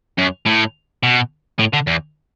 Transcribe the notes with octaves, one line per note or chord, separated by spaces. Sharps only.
F#2
A2
B2
A2
D3
E2